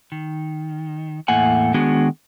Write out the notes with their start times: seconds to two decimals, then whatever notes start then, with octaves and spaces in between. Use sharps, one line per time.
0.12 D#3
1.28 E2 A2 A3 A#3 F#5 G#5
1.74 D#3 G#3 B3 D4 F#4 G#4